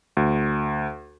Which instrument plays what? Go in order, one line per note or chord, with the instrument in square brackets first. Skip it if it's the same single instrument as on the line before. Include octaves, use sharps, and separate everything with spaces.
[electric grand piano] D2